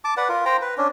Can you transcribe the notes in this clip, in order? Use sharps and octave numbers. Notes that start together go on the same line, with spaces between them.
A5 D6
B4 D5 F#5
F4 A#4
C5 G5 A#5
B4
C#4 D4